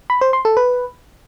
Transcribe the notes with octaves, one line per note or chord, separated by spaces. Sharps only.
B5
C5
C6
A4
B4